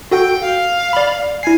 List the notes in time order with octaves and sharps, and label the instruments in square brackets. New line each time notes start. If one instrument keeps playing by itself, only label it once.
[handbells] F#4 A4 F#5 [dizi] G5
[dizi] F5
[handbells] D5 B5
[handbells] E4 C7 [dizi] G#5